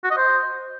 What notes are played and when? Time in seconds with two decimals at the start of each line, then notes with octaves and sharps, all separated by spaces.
0.04 F#4
0.10 D#5
0.17 C5